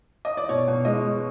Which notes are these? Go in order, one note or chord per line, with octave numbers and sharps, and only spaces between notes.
D#5
D5
B2 C#5
B2
G#3 D#5
G#3